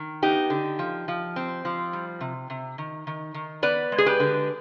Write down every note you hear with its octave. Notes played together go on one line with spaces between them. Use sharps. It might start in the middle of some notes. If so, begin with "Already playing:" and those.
Already playing: D#3
B3 D#4 G4
D3
F3
F3
C4
F3
G3
C3
C3
D#3
D#3
D#3
B3 B4 D5
G#3
G#4
G4 B4
D3